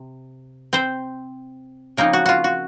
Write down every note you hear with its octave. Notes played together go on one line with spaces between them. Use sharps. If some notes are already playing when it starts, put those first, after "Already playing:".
Already playing: C3
C4 C5
C#3 F3 A#3 C4 D#4 A#4
F#4
F4 F#4
F#4